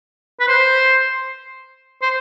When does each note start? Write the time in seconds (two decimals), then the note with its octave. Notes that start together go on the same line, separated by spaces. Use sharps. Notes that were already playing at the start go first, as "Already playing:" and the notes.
0.41 B4
0.48 C5
2.02 C5